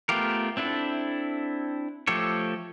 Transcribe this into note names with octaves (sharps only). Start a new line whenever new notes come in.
A3 B3 F4 G4 A#4
C4 D4 E4 A4
F3 A3 G4 A4 C#5